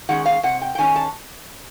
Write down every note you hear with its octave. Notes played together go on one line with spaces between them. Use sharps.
D#3 G#3 C#4 F#5
F5
C3 F#5
G5
G5
D#3 G#3 C#4 G#5
A5